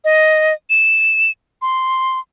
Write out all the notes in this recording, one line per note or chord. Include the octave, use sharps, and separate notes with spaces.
D#5
E7
C6